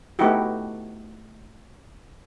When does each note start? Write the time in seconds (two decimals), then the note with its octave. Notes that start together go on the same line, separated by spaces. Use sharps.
0.19 A3 B3 D#4 E4 F#4 G4